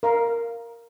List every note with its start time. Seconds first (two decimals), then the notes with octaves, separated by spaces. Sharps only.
0.03 A#4 F5